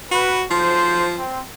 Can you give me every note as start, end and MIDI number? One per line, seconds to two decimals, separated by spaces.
0.11 0.44 66
0.11 0.40 71
0.51 1.06 35
0.51 1.24 53
0.51 1.06 72
1.18 1.41 60